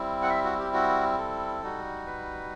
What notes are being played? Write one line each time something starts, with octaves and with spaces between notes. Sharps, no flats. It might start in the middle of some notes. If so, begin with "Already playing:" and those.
Already playing: G3 C4 E4
F#5
E5
F#4
G4
F#4
A4
G3 D#4 F#4
B4